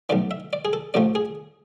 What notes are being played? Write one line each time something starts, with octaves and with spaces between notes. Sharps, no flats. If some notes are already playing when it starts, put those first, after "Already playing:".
B1 A2 E3 D5
E5
D5
G#4
A4
A1 A2 F3 A3 D5
G#4